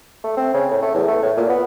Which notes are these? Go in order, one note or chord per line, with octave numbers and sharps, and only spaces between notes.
A3
C4
C#3
A2
A3
E2
A3
A2
A#2
B3